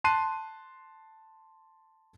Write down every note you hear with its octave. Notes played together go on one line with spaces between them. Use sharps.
A5 C6 F#6 C7 D#7